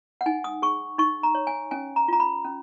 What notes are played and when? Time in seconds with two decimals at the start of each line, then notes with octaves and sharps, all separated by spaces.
0.21 F#5
0.26 D#4 G#5
0.44 D#6
0.62 G#4 C#6
0.98 D#4 C#6
1.23 A#5
1.35 C#5
1.47 G#5
1.71 C#4 G#5
1.96 A#5
2.08 F4 A#5
2.20 B5
2.44 C#4